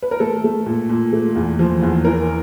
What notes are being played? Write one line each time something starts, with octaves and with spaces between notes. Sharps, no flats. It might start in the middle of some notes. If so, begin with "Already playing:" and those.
B4
A#4
A3 A4
A3
A#2
A#2
A3
E2
F3
E2
E3 A#4